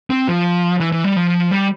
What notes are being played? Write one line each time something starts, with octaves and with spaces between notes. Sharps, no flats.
C4
F3
E3
E3
G3
F3
G3